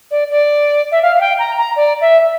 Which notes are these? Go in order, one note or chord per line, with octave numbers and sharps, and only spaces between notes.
D5
D5
E5
F5
F5
G5
A#5
A#5
D5
E5